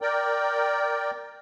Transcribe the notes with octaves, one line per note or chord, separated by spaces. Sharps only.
A#4 D5 G5